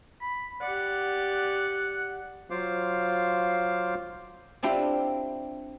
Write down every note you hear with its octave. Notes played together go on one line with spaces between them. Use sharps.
B5
G4 D5 F#5
F#3 F4 C5 F5 D6
C4 D4 E4 F4 G4